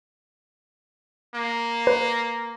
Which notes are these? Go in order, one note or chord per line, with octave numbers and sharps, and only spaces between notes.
A#3
B4